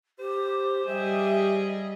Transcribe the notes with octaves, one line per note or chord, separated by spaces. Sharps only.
G4 C5
G3 G4 G#4 D#5 E5